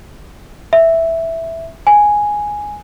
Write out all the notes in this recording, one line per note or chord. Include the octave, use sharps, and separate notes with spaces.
E5
G#5